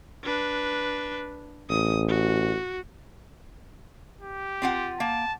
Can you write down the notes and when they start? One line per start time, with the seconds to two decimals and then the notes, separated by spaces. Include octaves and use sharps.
0.23 D4 B4
1.70 A1 D#6
2.09 F#4
4.21 G4
4.62 C4 F4 F#5
5.00 A#3 A5